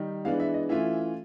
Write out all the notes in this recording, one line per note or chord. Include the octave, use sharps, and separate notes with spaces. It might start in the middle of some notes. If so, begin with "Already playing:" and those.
Already playing: D#3 G3 D#4
E3 G#3 B3 D4 F5
E5
D#5
E3 A3 C#4 F4 E5